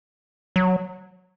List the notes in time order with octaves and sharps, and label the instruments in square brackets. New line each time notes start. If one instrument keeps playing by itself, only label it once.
[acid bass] F#3